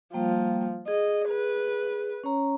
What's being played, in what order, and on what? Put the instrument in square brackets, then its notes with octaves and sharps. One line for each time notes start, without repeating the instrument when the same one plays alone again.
[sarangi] F3 [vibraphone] G3 A#3 G5
[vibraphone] G#4 [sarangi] D#5
[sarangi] B4
[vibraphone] C#4 C#5 A#5